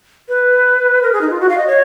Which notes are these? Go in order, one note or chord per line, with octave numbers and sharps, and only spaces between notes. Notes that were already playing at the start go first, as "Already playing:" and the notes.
B4
A#4
G#4
D#4
F4
F#4
F5
D#5
C#5